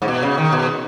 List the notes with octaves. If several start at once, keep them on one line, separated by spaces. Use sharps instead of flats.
G#2
B2
C#3
D#3
B2